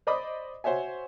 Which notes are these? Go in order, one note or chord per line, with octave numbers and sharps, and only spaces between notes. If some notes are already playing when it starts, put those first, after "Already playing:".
C5 D5 D#5 B5 D6 D#6
F#4 C5 C#5 E5 G#5